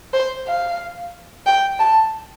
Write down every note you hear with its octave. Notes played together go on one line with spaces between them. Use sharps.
C5
F5
G5
A5